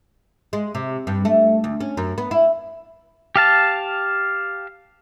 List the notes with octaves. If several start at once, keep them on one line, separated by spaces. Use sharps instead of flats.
G#3
C3
G2
A3
D2
C#4
F#2
B3
E4
G4 F5 A5